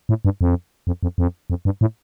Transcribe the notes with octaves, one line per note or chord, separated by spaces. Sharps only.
A2
G2
F2
F2
F2
F2
F2
G2
A2